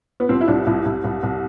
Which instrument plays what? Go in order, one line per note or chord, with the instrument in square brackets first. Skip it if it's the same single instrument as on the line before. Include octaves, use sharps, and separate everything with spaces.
[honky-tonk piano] B3
C2 C4
E4
C2 D4
C2 E4
C2
C2
C2